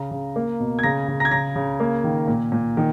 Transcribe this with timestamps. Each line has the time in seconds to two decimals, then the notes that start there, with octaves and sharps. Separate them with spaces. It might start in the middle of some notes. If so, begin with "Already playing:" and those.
Already playing: C#3 A#5
0.11 C#3
0.36 A#3
0.60 B2
0.79 G#6
0.83 C#3 A#5 A#6
1.08 C#3
1.20 A#5 A#6
1.25 G#6
1.31 C#3 A#5 A#6
1.56 C#3
1.80 A#3
2.04 D#3
2.28 A#2
2.52 A#2
2.77 D#3